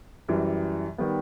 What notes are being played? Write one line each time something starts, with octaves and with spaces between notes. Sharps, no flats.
F#2 E3 G3
D#3 G3 B3